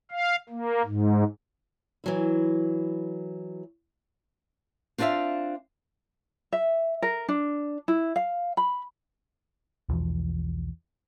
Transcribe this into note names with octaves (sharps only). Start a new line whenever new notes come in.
F5
A#3
G#2
E3 F#3 E4
C4 D4 F4 A#4 E5 F5
E5
A#4
D4
E4
F5
B5
B1 E2 E3 F3